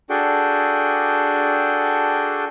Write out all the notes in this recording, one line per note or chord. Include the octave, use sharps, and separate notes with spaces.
D4 F#4 G#4 A4 G5